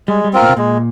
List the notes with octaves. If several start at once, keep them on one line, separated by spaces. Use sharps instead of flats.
G3 G#3
G3
C4 F4 A#4
A#2
C3
A#2 G#3